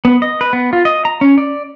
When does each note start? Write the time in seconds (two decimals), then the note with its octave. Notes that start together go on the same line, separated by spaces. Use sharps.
0.05 B3
0.22 D#5
0.41 B4
0.53 B3
0.73 F4
0.85 D#5
1.05 A#5
1.21 C#4
1.38 D5